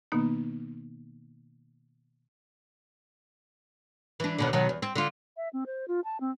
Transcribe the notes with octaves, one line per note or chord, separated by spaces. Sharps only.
B2 D#3 A#3 B3 D#4
E3 D4
D#2 B2 D3
B2 D#3 F#3
E2
C4
D3 F4
E5
C4
C5
F4
A5
C4